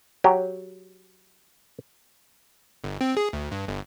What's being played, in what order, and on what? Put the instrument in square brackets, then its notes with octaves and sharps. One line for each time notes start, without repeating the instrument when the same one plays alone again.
[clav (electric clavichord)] F#3 G4
[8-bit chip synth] G1
C4
G#4
D2
G2
G1